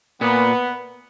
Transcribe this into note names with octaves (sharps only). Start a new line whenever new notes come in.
A#2 B3